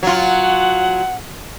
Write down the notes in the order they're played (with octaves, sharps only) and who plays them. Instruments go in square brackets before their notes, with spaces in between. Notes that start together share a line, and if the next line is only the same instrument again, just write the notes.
[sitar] F#3 F4 [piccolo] F#5